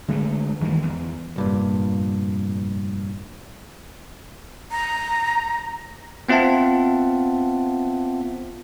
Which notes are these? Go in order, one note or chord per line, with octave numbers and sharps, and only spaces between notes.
D3 G#3 A3
E2 D#3 E3 G#3
E2
F1 G2 A#2
A#5
B3 C4 F4 E5 F#5 A5